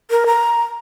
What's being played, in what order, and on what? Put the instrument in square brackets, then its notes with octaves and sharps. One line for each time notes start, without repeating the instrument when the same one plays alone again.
[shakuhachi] A#4
A#5